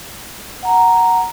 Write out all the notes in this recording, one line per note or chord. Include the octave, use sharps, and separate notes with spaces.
F#5 A#5